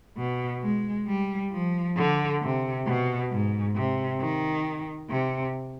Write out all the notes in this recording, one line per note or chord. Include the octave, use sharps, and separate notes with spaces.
B2
G#3
G3
F3
D3
C3
B2
G#2
C3
D#3
C3